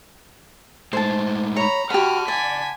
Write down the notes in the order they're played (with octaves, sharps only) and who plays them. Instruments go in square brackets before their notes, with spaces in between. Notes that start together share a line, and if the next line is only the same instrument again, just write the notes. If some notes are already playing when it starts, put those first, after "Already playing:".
[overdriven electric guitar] A2 G#3 [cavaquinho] C5 A5
[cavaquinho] C#5 [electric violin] A#5 B5
[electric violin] F#4 F6 [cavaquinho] G4 B5 [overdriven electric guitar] F#5 A5
[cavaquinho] D5 [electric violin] G#5 B6